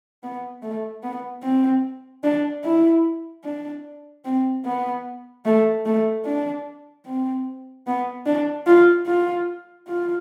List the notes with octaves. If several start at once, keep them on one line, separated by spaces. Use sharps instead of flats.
B3
A3
B3
C4
D4
E4
D4
C4
B3
A3
A3
D4
C4
B3
D4
F4
F4
F4